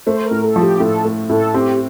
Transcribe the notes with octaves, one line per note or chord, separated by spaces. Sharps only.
A3 C5
A#4
A2
A4
F3
G4
A2 A4
A3
A2 A4
C4 G4